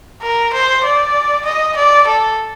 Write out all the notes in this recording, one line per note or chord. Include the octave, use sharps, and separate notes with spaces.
A#4
C5
D5
D#5
D5
A4